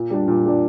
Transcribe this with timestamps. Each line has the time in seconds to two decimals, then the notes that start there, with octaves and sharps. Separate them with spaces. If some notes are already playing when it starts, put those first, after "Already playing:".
Already playing: A#2
0.10 G3 D4
0.28 A#2
0.45 G3 D4